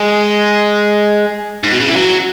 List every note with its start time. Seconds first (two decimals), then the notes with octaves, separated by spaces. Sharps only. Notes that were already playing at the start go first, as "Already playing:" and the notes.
Already playing: G#3
1.64 G#2
1.72 B2
1.80 C#3
1.88 E3
1.96 F#3